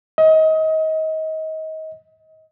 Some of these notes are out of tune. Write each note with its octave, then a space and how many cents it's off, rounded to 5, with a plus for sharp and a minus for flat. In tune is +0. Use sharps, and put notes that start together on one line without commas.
D#5 +25